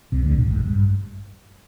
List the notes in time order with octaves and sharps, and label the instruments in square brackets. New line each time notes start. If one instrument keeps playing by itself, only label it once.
[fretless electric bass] C2 C3
D2 D3
A#1 A#2
G2
G#1 G#2
G2